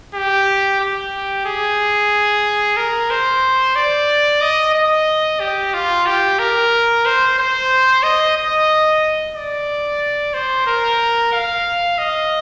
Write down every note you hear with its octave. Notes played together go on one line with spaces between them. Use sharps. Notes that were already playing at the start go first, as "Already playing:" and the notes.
G4
G4
G#4
A#4
C5
D5
D#5
D#5
G4
F4
G4
A#4
C5
C5
D#5
D#5
D5
C5
A#4
F5
D#5